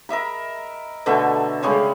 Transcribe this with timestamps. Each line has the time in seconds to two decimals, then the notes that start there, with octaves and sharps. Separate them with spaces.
0.09 A#4 D#5 E5 B5
1.06 B2 D3 A3 E5
1.62 C#3 G3 G#3 C#4